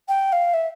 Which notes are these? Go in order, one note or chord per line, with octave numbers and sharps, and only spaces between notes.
G5
F5
E5